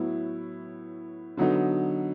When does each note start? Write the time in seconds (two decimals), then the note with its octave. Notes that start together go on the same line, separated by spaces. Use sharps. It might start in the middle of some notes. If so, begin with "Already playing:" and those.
Already playing: A2 F#3 B3 E4
1.37 D3 F#3 B3 D#4